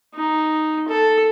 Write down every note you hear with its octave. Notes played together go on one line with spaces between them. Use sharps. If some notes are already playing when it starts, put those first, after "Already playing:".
D#4
A4